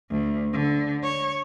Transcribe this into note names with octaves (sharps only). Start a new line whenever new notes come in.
D2
D3
C#5